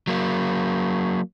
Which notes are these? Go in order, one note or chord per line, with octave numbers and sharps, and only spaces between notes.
F#3 A#3